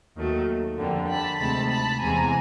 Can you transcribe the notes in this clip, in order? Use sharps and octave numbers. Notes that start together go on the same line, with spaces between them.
D#2 D#3 F#3 A3
F2 D3 G3 A#3
A5 B5
D2 C3 D#3 G#3 A5 B5
A5 B5
E2 C3 E3 G#3 G#5 A#5